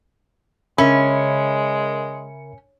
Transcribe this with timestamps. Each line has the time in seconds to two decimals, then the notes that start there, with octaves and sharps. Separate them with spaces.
0.78 C#3 G#3 C#4 A#4 E5 B5 C#7